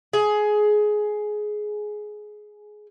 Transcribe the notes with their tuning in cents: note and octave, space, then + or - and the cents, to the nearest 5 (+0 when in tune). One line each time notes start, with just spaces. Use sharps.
G#4 +15